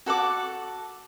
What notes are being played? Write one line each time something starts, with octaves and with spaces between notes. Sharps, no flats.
F#4 A4 F#5 D6